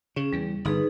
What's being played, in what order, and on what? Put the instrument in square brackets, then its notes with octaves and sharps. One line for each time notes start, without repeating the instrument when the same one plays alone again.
[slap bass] C#3 [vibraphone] C#4 G#4
[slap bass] E2 [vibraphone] G3
[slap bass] G1 [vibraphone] D#4 G#4 B4